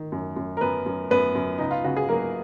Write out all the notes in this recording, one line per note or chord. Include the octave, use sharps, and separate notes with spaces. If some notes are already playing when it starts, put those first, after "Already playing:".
Already playing: D#3
F#2
F#2
A#4
F#2 B3 B4
F#2
F#2 B3 B4
F#2
C#2 D#4
F4
C#3 F#4
G#4
F#3 A#3 A#4